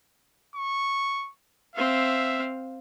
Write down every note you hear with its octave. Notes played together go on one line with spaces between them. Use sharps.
C#6
C4 E5 F5